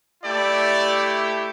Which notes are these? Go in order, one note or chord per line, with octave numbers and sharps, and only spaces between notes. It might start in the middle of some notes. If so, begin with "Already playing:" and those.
A3 E4 G4 D5